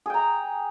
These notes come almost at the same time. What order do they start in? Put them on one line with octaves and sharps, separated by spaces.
G#4 G5 A#5